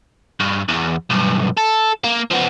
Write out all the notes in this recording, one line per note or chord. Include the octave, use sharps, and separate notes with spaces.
G2
E2
B1 G2
A4
A#3
F3 B3